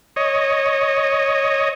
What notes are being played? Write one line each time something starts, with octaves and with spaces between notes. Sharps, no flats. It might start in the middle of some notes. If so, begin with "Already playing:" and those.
C#5 D#5